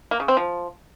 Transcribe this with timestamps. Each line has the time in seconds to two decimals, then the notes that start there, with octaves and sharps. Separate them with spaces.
0.11 A#3
0.20 C#3
0.28 C4
0.37 F3